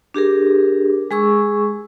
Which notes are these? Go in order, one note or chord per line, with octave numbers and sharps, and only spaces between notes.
D4 G4 G#4 A#4
G#3 G#4 C#6 E6